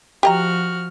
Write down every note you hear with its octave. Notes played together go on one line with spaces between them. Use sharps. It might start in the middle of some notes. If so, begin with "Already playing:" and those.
F3 F#4 G4 D#5 A#5 F6